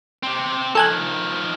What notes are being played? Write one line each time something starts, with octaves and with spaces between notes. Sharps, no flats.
C4 G4
D#3 F3 A4 G#5 F#6